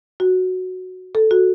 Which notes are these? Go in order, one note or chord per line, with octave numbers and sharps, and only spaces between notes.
F#4
A4
F#4